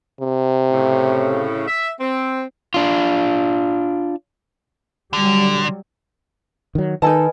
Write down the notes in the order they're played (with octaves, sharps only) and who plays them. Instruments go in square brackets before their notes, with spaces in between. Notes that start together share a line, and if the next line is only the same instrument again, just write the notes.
[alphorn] C3
[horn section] A2 C#3
E5
C4
[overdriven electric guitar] D4 F4
[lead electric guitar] D3 [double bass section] F#3 G3
[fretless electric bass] D#3 F#3
[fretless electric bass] D#3 [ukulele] D#4 A4 A5 [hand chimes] B4 D#5 G#5